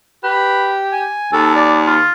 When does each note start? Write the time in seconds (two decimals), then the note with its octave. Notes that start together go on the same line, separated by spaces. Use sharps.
0.24 G4 B4
0.92 G#5
1.33 D#2 A4
1.55 D5
1.86 F4